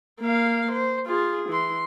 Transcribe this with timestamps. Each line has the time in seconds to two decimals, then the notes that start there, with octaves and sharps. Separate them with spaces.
0.21 A#3 F5
0.72 C5
1.07 F4 G#4
1.50 E3 C6